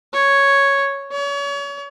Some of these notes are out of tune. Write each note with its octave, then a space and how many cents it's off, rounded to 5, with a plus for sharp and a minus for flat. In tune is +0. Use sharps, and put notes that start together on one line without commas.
C#5 +0
C#5 +35